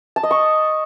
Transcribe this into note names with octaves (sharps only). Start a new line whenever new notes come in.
A5
D#5
C#6